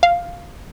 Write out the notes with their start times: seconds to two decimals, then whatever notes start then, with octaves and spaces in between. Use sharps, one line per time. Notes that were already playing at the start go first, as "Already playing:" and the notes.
0.03 F5